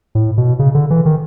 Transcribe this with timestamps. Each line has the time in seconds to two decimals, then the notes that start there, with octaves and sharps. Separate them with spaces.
0.15 A2
0.38 B2
0.59 C#3
0.75 D3
0.90 E3
1.05 D#3